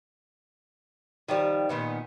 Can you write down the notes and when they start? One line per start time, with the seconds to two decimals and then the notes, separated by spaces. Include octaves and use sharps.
1.28 D#3 F3 G3
1.69 A#2 D#3 B3